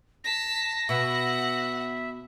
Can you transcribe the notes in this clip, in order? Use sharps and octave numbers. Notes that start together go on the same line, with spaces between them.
A5 A#6 B6
B2 E5 F#5